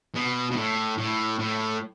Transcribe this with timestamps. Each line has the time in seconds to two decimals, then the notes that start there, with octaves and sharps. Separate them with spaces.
0.15 B2
0.51 B2
0.56 A2
0.98 A2
1.39 A2